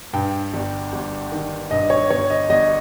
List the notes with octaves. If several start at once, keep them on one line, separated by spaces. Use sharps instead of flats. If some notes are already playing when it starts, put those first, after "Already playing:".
G2 G5
G1
G1
D#3
G2 D#5
C#5
G1 C#5
D#5
G1 D#5